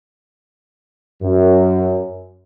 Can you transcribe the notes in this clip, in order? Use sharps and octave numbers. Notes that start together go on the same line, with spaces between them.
F#2